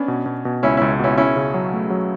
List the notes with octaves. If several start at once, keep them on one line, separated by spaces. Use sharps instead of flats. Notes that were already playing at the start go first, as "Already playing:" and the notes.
Already playing: B3 C#4 D4
B2
B2
B2
C#2 C#4 E4
C#2 C#4 E4
B2 C#4 E4
C#3 C#4 E4
C#3
F#3
A3
F#3